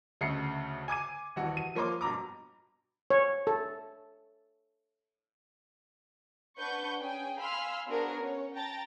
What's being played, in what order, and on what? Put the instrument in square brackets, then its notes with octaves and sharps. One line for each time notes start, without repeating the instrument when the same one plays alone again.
[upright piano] D2 C#3 A3 D#5 C7 C#7
G#5 D6 G#6 D#7
D#1 E3 F#4
D#7
F3 A#3 C#5 C6 D6
G2 B2 A#5 D6
[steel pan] C#5
A4
[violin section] D4 B4 F#5 C#6 G6
C#4 G#4 G5 G#5
F5 G#5 B5 C6 E6 F6
B3 D4 F#4 G#4 A#4 C5
C#4 C#5
G5 A5 A#5 A6